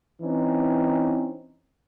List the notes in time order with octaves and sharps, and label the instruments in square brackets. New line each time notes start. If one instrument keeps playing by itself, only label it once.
[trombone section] E3 C4 C#4 D#4